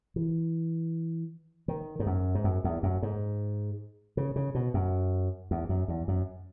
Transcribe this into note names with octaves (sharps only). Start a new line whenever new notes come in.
E3
D#3
G#2
F#2
G#2
F#2
E2
F#2
G#2
C#3
C#3
B2
F#2
E2
F#2
E2
F#2